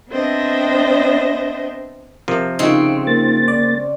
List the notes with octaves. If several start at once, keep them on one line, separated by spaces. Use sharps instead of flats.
B3 C4 D4 C5 D#5 E5
C3 F3 A#4
C#3 C4 D#4 F4
A#3 A6
D5